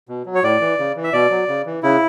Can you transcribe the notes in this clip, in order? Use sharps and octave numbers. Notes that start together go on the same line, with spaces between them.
B2
F#3
C#5
A2 D5
E3
C#3
E3
E5
B2 D5
F#3
C#3
E3
C#3 E4